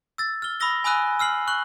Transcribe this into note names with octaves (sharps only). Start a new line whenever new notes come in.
E6 A6
F6 G7
B5 D#6 E6 A#6 G7
G#5 B5 D#6 E6 F#6 D#7
E6 F6 C7 F#7
C#6 F#6 F#7